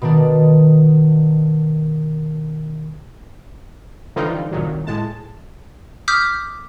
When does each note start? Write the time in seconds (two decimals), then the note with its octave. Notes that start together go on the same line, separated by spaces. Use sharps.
0.01 B2 D#3 D4
4.16 D3 E3 F3 G3 D#4 F4
4.51 C2 A#2 D#3 F#3
4.87 A2 G#3 A5
6.08 D6 D#6 F6 G6 B6